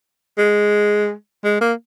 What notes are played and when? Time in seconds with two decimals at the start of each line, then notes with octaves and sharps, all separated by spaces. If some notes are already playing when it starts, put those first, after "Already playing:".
0.38 G#3
1.44 G#3
1.61 A#3